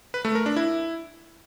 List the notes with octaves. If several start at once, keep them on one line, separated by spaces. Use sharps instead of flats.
B4
A3
A#4
D4
E4